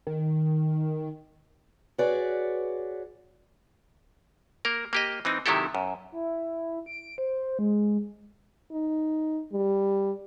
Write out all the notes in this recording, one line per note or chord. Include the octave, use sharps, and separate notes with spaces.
D#3
F#4 G#4 B4 C#5 D5
A#3 A#4
A#3 G4 D#5
E3 C4 D#4
C3 D#3 F#3 E4 G4 A4
F#2
E4
D7
C5
G#3
D#4
G3